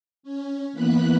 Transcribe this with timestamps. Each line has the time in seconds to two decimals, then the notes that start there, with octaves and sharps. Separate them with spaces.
0.23 C#4
0.73 E3 A#3 B3 B5 F#6